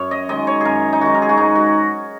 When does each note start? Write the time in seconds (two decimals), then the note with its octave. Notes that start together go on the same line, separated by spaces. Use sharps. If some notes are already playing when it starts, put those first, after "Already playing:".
Already playing: F#2 C#5
0.11 D#5
0.29 D#3 G#3 D#5
0.47 C#5
0.61 F#2 G#4 A#4
0.93 D#4
1.01 D#3 G#3 F#4
1.15 A#4
1.22 G#4
1.29 F#4
1.37 G#2 D#4
1.55 F#4